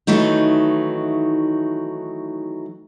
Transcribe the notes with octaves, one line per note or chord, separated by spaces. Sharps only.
D#3 E3 F#3 A3 D#4